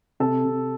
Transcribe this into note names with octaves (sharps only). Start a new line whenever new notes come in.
C3 A4
C3